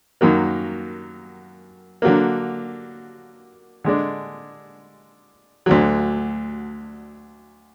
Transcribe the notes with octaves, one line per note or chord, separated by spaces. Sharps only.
F#2 D#3 F#3 A#3
D3 F#3 A#3
D3 G#3 D4
D2 D3 F#3